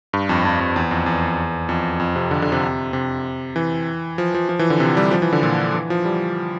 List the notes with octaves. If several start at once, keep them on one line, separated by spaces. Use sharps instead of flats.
G2
F2
F2
F2
E2
F2
E2
F2
F2
C3
D3
D3
C3
C3
E3
F3
F3
F3
E3
D3
C3
G3
F3
E3
D3
A#2
E3
F3
G3